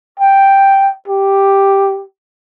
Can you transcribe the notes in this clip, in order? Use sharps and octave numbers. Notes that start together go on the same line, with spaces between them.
G5
G4